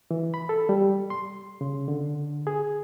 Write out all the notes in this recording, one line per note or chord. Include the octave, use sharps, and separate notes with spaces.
E3
B5
A4
G3
C6
C#3
D3
G#4